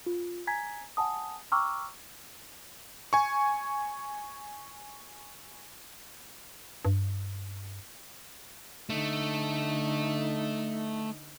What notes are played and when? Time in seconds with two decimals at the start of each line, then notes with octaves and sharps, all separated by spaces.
0.06 F4
0.47 G#5 A#5 G#6 B6
0.97 F#5 G#5 A5 D#6
1.52 G5 A#5 C#6 D6 E6 F6
3.13 G#5 C#6
6.85 G2
8.90 D3 A3 D#4